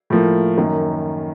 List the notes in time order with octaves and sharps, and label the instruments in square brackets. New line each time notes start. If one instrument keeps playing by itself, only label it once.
[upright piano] A2 F3 A#3
F#2 D#3 A#3